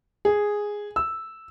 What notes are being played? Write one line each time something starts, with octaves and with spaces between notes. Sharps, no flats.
G#4
E6